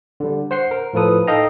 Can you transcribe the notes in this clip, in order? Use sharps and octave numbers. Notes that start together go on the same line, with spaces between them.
D3 G3
C5 F#5 C6 C7
A#4
A2 F3 F4 A4 B4 D#6
D#4 A4 D#5 F5 G5 A#5